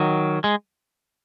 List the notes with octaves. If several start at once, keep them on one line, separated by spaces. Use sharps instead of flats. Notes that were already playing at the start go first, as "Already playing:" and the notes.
Already playing: D#3 F#3
G#3